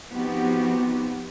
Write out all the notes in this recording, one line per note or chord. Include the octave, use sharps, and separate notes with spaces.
F3 B3 C4 D#4 F#4 G4